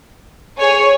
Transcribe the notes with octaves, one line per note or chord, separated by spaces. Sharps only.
G#4 C#5 G#5